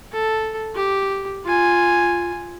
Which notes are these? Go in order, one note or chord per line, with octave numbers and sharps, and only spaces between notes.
A4
G4
F4 G#5